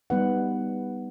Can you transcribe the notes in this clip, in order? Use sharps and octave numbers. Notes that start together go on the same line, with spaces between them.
G3 B3 D#4 B4 F#5